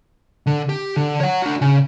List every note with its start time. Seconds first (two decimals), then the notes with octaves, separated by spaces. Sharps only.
0.47 D3
0.69 G4
0.97 D3
1.21 C#5 F#5
1.42 D4 F#4
1.61 C#3